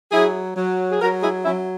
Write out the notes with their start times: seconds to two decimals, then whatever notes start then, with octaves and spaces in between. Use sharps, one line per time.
0.12 F#3 E4 G#4
0.56 F#3
0.90 G#4
1.01 F#3 F#4 A#4
1.22 E4 G#4
1.45 F#3 C#4 E4